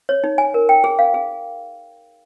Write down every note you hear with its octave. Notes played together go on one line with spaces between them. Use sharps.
C#5
D#4
G#5
A#4
G5
G#4
F5
G#4